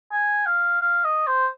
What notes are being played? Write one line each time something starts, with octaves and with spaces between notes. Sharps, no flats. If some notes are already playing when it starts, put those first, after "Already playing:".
G#5
F5
F5
D#5
C5